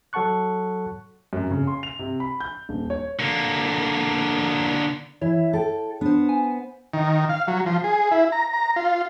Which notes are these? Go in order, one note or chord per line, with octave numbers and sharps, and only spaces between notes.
F#3 A4 F#5 A5 C#6 F#6
F#2
C#3
C6
F7
C3
B5
G6
D#1
C#5
D3 A#3
E3 E4 C#5 E5
A4 G5
B3 D4 C5
G#5
D#3
F5
F#3
F3
G#4
E4
A#5
A#5
F4